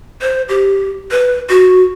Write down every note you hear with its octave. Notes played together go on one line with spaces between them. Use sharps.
C5
G4
B4
F#4